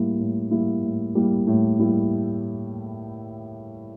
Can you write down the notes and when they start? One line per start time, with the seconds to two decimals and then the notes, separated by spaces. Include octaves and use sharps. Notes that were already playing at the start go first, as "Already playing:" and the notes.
Already playing: A2 G3 A#3 E4
0.19 A2
0.51 G3 A#3 E4
0.83 A2
1.15 G3 A#3 E4
1.47 A2
1.79 G3 A#3 E4